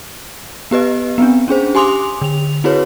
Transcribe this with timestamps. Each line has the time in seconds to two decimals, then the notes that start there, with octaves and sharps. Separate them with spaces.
0.71 B3 G4 B4 D#5
1.18 B3 C4 D4
1.48 C#4 D4 G#4 C5
1.75 G4 G#5 C6 D6 D#6 F7
2.22 D3 F7
2.64 C4 E4 F#4 G#4 B4 C#5